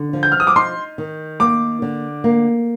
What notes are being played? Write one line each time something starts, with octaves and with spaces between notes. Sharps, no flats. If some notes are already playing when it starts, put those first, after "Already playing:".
Already playing: D3
F3
G6
F6
D#6
D6
D#4 C6
D#3
A#3 D6
D3
A#3